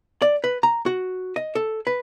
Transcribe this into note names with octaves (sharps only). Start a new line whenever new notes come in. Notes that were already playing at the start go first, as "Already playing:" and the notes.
D5
B4
A#5
F#4
D#5
A4
B4